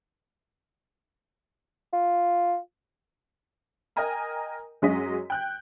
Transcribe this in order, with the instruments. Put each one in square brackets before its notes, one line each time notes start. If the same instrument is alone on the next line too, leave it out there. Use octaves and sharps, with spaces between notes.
[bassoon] F4
[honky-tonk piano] A#4 D#5 G5 G#5 A#5 F6
F#2 F#3 G#3 C#4 D#5 B6
G5 F#6 G6